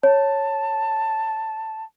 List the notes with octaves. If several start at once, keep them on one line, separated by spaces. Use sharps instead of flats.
C#5 A5